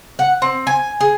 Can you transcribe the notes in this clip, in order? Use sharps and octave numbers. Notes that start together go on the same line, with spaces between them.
F#5
C4
G#5
G#4